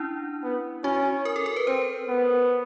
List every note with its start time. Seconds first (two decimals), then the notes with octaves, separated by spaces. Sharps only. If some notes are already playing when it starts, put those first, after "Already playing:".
Already playing: C#4 D4 E4
0.44 B3
0.84 C#4 F#4
1.25 A#4
1.36 A4
1.46 A#4
1.56 B4
1.67 C4 C5
2.08 B3